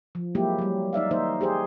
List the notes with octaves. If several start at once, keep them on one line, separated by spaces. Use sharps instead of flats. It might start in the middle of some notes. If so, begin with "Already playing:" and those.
F3
F#3 G#3 A#3 E4 G4
F#3 G3
D#4 D5 E5 F5
D#3 A#3 D#4 C5 E5
G4 G#4 C5